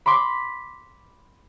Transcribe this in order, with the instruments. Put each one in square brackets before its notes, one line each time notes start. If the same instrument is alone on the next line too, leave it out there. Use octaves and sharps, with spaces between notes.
[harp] B5 C6 D6 B6